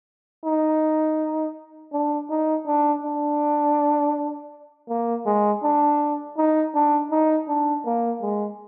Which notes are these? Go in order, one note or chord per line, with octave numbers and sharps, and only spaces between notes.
D#4
D4
D#4
D4
D4
A#3
G#3
D4
D#4
D4
D#4
D4
A#3
G#3